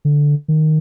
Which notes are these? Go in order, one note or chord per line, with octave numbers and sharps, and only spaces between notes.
D3
D#3